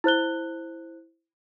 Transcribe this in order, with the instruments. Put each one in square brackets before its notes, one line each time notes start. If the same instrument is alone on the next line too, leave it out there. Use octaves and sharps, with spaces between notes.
[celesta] E4 C5 F#6 G7